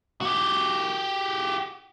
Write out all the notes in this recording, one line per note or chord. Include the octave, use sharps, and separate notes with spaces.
F#4 G4